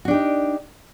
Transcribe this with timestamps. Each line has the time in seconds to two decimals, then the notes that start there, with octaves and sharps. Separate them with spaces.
0.05 F#4
0.08 D4
0.11 G4
0.13 D#4